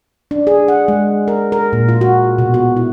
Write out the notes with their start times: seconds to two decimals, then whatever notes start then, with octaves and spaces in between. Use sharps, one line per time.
0.31 D4
0.47 G#4
0.68 F#5
0.88 G#3
1.28 A#4
1.52 A#4
1.73 A#2
1.88 F4
2.01 F#4
2.38 B2
2.54 F#4
2.77 E4